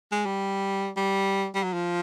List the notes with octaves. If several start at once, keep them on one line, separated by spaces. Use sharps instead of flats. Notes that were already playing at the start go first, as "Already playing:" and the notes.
G#3
G3
G3
G3
F#3
F3